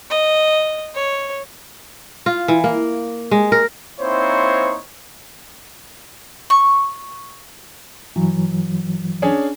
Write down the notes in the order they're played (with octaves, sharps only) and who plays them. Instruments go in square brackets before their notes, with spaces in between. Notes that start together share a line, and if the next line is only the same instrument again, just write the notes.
[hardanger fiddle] D#5
C#5
[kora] F4
E3
A#3
G#3
A#4
[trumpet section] A#3 C4 D#4 E4 C5 C#5
[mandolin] C#6
[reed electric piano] G2 E3 F#3
[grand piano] C#4 D4 G#4